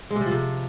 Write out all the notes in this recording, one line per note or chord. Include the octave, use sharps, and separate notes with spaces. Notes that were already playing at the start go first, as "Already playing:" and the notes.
G#3
C3
G3
F3
C3